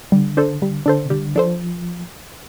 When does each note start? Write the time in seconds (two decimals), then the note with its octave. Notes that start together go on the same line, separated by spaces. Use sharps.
0.12 D3 G3
0.37 D4 A4 C5
0.62 D3 G3
0.86 D3 D4 A4 C5
1.05 C3
1.10 D3 G3
1.35 F3 D4 A4 C5